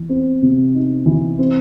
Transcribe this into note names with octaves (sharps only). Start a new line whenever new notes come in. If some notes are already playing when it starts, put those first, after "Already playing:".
Already playing: E3
C4
C3
D#4
E3
C4